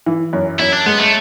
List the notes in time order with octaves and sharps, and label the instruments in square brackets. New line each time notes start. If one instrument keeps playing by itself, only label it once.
[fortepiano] E3
F#2
[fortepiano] F#2 [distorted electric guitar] E4
[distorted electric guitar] D4
[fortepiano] G#3 [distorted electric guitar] B3
[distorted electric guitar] A3